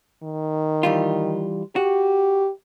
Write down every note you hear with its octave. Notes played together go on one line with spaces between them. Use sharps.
D#3
E3 G3 F4
F#4 G4